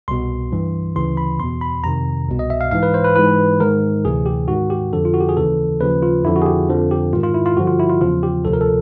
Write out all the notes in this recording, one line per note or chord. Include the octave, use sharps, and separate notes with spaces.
C2 B2 C6
G2 E3
D2 C#3 E3 C6
B5
E2 B2 C6
B5
F2 C3 D#3 A#5
C2 B2
D#5
E5
F5
G#2 E3 F5
B4
C5
B4
G#2 E3 B4
G#2 D#3 A#4
D2 C3 E3 G#4
G4
G#2 D#3 F#4
G4
F2 D3 F3 A4
F4
F#4
G4
G#4
D#2 C#3 E3 A4
D#2 C#3 F3 B4
F4
F2 D3 F3 E4
F#4
G#4
G4
F2 D3 F3
G4
G#2 D#3 F4
F4
E4
F4
G2 D3 F3 F#4
F4
E4
F4
E2 C#3 F3 F4
G4
D2 C3 F3 A4
A#4
A4